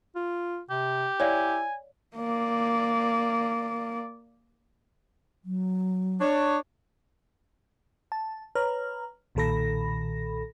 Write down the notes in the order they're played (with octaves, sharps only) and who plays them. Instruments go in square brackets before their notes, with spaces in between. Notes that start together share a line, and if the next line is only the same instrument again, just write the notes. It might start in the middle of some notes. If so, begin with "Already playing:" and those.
[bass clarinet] F4
[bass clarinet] C3 [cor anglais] G4
[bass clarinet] E4 [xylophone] C#5 D5 F5 [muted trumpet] G#5
[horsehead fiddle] A#3 D5
[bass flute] F#3
[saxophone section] D4 C#5
[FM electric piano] A5
B4 C#5 A#5 F6
B1 A#2 D#3 A4 B5 A#6